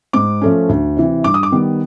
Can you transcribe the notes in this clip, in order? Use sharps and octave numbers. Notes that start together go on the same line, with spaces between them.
G#2 D6
F3 A3 C#4
D2
C3 E3
G2 D6
D#6
D6
D#3 G3 B3